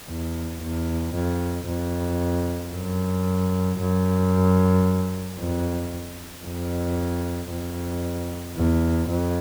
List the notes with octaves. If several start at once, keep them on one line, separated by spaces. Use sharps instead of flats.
E2
E2
F2
F2
F#2
F#2
F2
F2
F2
E2
F2